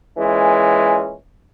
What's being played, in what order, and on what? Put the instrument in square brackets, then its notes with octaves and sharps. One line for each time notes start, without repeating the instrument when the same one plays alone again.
[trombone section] A#2 E3 G#3 C#4